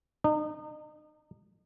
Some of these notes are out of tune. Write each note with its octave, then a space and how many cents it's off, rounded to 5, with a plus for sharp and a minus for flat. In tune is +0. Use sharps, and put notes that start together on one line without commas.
D#4 -35